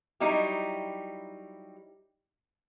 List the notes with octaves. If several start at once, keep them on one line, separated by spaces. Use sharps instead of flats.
F#3 G3 D#4 E4 G4